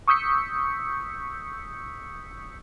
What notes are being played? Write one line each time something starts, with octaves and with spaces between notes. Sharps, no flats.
C#6 D#6 E6 G6 B6 C#7